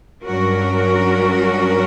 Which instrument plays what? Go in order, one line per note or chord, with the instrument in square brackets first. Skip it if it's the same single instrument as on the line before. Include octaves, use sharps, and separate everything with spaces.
[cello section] G2 F#3 C#4 F#4 A#4